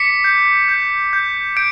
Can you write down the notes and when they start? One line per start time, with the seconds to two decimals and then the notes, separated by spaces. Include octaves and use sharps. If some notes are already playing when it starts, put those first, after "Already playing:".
Already playing: D6 B6 C#7
0.24 G6
0.68 G6
1.13 G6
1.56 G6 D7